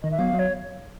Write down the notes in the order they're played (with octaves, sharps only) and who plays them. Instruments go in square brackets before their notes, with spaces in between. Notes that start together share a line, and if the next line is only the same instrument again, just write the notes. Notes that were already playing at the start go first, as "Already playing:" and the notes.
[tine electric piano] D#3 [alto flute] D#5
[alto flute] E5
[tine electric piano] F#3 B3 [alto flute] F5
[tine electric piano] F#3
[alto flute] C#5